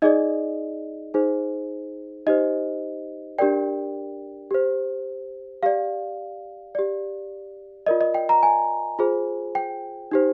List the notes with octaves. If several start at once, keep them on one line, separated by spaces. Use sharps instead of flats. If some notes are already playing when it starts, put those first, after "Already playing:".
D#4 G#4 D5 D#5
D#4 G#4 C5
D#4 G4 C5 D#5
D4 G4 A#4 D5 G5
G4 C5
G4 D5 F5
G4 D5
F4 A#4 D5 D#5
D#5
G5
A#5
G#5
F4 G#4 C5
G5
D#4 G4 C5